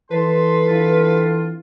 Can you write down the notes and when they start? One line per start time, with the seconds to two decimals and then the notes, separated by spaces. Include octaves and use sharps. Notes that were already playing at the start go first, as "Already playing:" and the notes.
0.11 E3 A4 B4 A5 C6
0.68 E3 C4 D4 F4